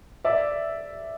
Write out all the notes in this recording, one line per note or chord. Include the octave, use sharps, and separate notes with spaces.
D5 E5